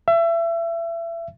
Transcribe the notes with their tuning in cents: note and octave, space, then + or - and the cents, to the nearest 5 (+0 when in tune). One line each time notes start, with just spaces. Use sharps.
E5 +30